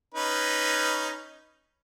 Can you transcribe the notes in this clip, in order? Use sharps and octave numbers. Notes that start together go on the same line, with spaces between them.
C#4 D#4 B4